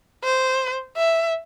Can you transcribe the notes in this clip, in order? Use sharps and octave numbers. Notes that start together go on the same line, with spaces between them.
C5
E5